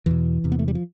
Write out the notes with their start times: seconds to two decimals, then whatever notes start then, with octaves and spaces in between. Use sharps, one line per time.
0.06 E2 B2 E3
0.44 E2 C3
0.52 B3
0.59 A3
0.68 G3
0.75 F3